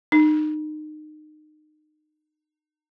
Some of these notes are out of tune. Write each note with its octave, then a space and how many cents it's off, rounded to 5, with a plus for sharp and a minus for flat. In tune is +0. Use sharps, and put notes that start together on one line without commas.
D#4 -25